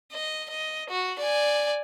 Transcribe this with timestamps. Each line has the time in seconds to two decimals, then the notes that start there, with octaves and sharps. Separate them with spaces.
0.12 D#5
0.50 D#5
0.90 F#4
1.19 D5 G#5